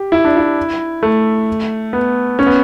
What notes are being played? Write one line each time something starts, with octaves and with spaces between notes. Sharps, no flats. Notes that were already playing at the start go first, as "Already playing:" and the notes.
Already playing: G4
E4
D4
E4
A3
B3
C#4
B3